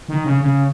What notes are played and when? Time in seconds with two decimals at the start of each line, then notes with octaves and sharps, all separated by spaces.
0.09 D#3
0.25 C#3
0.41 C#3